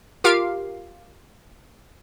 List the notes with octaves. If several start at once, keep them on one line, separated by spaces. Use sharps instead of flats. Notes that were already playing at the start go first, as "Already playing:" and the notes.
F4 G4 A#4 F5